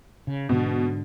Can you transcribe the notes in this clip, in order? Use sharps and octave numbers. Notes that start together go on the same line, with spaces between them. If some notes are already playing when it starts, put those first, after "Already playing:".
C#3
G#2 B2 D3